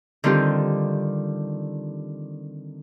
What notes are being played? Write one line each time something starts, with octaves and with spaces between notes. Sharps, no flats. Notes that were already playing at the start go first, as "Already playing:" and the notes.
D3 D#3 G3 C4 F4 G4